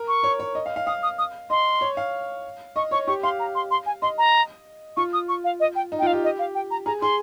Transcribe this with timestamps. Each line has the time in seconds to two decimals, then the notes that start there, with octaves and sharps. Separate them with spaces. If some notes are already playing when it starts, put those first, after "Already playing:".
Already playing: A#4
0.08 C#6
0.23 C#5
0.39 C#5
0.55 D#5
0.66 F5
0.76 F5
0.87 F5 D#6
1.03 D#6
1.19 D#6
1.50 D#5 C6
1.81 C#5
1.97 F5
2.76 D#5 C#6
2.91 C#5 C#6
3.07 G4 C#6
3.23 F5 C6
3.40 A#5
3.55 C6
3.71 C6
3.86 G#5
4.02 D#5 C6
4.18 A#5
4.97 F4 C#6
5.13 D#6
5.29 C#6
5.44 F5
5.60 D#5
5.76 G5
5.92 D#4
5.99 G5
6.02 F4 F5
6.13 G4
6.24 D#5
6.39 F5
6.55 G5
6.71 A#5
6.86 G#4 A#5
7.02 G#4 C6